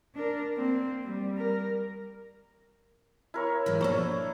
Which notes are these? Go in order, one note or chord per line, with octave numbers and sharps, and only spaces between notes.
D4 A#4
A#3 C4
G3
A#4
E4 A#4 C#5
G#2 E3
A#1 B2 D4 C5 C#5 A5